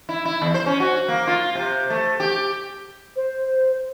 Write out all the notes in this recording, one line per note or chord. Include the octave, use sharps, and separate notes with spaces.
E4
E4
E2
C5
C#4
F#4
A#3
F4
C3
A3
G4
C5